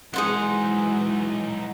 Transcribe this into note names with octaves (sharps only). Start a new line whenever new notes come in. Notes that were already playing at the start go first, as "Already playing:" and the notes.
E3 F#3 G#3 D#4 G#4 C5 F#5